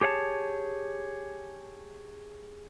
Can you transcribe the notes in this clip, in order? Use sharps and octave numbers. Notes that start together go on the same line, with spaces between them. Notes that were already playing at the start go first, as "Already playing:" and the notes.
G4 G#4 C#5 F5 A5